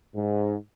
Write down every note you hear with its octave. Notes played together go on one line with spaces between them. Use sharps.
G#2